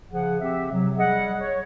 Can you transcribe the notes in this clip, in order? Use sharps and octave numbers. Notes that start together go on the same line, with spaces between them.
C#3 F3 G#4 F#5
C4 G4 E5
C3 F#3
G3 G#4 D#5 F#5
C#5